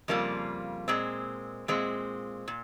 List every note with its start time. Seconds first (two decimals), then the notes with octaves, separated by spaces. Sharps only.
0.08 F2 C#3 G3 A#3 F4
0.88 A#2 G#3 C4
1.68 A#2 G#3 C4
2.48 A#2